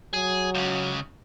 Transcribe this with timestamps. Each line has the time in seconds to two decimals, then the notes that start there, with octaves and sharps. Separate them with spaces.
0.13 F#3 G#4
0.55 C#2 C#3